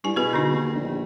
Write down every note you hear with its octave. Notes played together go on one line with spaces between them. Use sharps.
G2 E4 G#5
B2 G#4 B4
D3 D4 D#4
D#2
A#1